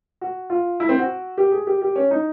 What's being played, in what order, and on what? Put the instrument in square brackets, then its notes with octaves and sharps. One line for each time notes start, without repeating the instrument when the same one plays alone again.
[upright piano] F#4
F4
E4
C4
F#4
G4
G#4
G4
G4
C#4
D#4